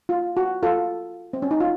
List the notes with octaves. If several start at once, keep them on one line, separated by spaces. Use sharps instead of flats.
F4
F#4
F4 A4
C4
C#4
D#4
F4